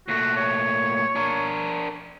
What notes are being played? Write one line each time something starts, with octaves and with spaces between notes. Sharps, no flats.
A#2 A3 F#4
C#5
D4 A#4